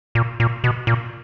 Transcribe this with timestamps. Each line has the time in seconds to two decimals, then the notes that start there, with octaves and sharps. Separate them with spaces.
0.15 A#2
0.40 A#2
0.64 B2
0.87 A#2